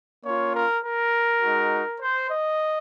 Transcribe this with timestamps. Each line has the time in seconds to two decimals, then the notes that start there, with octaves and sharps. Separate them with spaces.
0.24 A#3 C#4 F4 C#5
0.53 A#4
0.82 A#4
1.41 G#3 D#4 F#4
2.00 C5
2.30 D#5